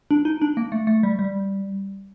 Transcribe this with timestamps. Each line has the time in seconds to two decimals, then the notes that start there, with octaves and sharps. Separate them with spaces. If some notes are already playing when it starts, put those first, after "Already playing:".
0.11 D4
0.25 D#4
0.42 D4
0.57 A#3
0.72 A3
0.87 A3
1.03 G3
1.19 G3